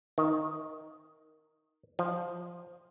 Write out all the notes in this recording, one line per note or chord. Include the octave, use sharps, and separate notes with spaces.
D#3
F3